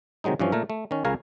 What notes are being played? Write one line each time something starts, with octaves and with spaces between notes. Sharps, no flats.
C3 D#3 F#3 G#3 D#4
G2 E3 F3 C#4
A#2 A3 A#4
A3
D#3 C#4
C#2 C#3 A#4 C#5 F5 G#5